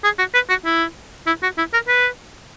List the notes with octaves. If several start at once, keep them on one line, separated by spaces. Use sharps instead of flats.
G#4
F#4
B4
F#4
E4
E4
F#4
E4
A#4
B4